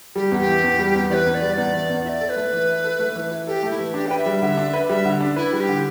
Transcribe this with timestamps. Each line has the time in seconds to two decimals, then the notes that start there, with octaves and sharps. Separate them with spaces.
0.16 G3 G4
0.31 E2
0.39 G4
0.47 E3
0.63 E2
0.79 G3
0.95 E2
1.10 E3 D5
1.14 B4
1.26 E2
1.34 D5
1.42 G3
1.57 E2 D5
1.74 E3
1.90 E2
2.05 E4 D5 E5
2.21 A4
2.29 B4
2.36 A3
2.53 E3
2.68 E4
2.84 A4
2.99 A3
3.15 E3
3.31 E4
3.47 G4 A4
3.63 A3
3.71 E4
3.79 E3
3.94 D4 G4
4.07 B4 G5
4.18 E5
4.26 G3
4.42 D3
4.57 D4
4.73 B4
4.89 G3 E5
5.05 D3
5.21 D4
5.36 E4 B4
5.53 G3
5.60 G4
5.68 D3